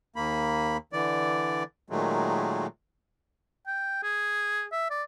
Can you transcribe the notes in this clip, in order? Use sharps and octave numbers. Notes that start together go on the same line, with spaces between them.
D#2 A#3 B5
D3 E3 D5
A#2 D#3 F#3 G#3 A3
G5
G#4
E5
D5